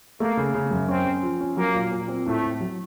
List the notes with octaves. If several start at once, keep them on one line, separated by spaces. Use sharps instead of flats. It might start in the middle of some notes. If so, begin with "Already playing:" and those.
A3 A#3
C#3
C#3
F#2
C4 C#4
C#4
F3
C#4
F#3 A#3
A#2
A#2
C4
A2 A3
A2
F#3